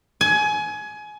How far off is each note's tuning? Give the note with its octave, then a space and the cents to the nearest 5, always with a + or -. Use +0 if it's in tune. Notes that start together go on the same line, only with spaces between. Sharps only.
G#5 +25